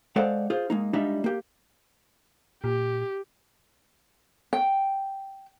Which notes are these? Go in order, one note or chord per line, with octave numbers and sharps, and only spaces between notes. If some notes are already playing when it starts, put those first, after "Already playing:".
G#3 A4 C5 D5 F5 F#5
F4 G#4 C5
G#3 A#3 D#4
G3 G#3 D4 D#4 F4 E5
A#3 G4
A#2 G4
G5